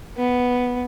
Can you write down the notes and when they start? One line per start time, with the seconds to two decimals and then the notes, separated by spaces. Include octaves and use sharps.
0.17 B3